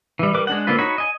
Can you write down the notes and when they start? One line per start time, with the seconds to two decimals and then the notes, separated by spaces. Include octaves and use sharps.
0.19 E3 G3
0.34 G3 A#4 B4 D6
0.47 G#3 D4 F#5
0.67 D3 A#3 C4 F4 B4
0.79 D#4 F#4 C#5 B5
0.98 D#5 G#5